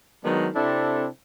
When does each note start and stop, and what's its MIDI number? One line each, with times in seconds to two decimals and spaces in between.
0.24 0.49 51
0.24 0.49 54
0.24 0.49 56
0.24 0.49 59
0.24 0.49 62
0.24 0.49 63
0.56 1.07 48
0.56 1.07 60
0.56 1.07 62
0.56 1.07 64
0.56 1.07 69